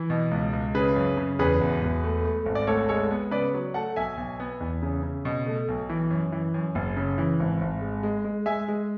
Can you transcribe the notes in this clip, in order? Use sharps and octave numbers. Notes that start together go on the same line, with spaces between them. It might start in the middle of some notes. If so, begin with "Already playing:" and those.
Already playing: E3 E4
B2
C#2
C#2
C#3 G#4 B4
F#2
C#3
E2 G#4 B4
E1
E1
A3
A3
G#1
D5
D2 A4 C#5
G#3 A4 C#5
B3
C#3 B4 D5
F#3
A3 F#5 A5
B1 E5 G#5
B1
B3
E2
C#3
C#3
B2
A3
B1
E3
F#2
E3
F#2
F#1
C#3
E3
G#1
G#1
G#3
G#3
G#3
G#3 E5 G#5
G#3